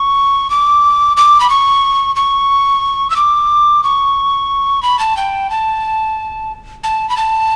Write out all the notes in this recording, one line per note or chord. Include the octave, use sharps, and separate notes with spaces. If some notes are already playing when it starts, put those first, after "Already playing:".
Already playing: C#6
D6
D6
B5
C#6
C#6
E6
D6
C#6
B5
A5
G5
A5
A5
B5
A5